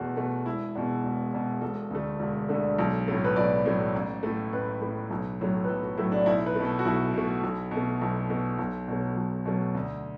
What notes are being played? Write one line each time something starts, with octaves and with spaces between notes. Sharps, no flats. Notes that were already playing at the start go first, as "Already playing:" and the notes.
Already playing: E2 B2 A3 F#4
B2 A3
E1 E4
E2 B2
E1
E2 B2
E1 A4
D2 D3 A3
E1
D2 D3 A3
B1
A2 F#3 A3
B4
B1 D5
A2 F#3 A3
A1
A2 A3
A1 B4
A2 A3
B1
A2 F#3 A3
B4
B1 A4
F#4
A2 F#3 A3 E4
D4
B1 E4
B4
B2 A3
A4
F#4
B1 E4
B2 A3
B1
B2
A3
B1
B2 A3
B1
B2 F#3 A3
B1
B2 F#3 A3
D2